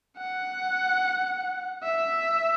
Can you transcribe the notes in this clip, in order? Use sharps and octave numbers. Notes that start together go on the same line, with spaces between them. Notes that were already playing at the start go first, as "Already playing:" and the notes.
F#5
E5